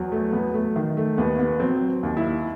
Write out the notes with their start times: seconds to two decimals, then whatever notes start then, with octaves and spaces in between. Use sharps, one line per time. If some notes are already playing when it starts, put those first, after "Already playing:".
Already playing: E2 F#3
0.12 A3
0.33 F#3 B3
0.54 A3
0.76 D#3
0.97 A3
1.18 D#2 B3
1.39 B3
1.60 F#3 C4
2.03 D#2
2.17 E4